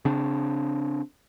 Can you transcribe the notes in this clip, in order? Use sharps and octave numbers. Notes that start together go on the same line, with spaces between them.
C#3 C4 D4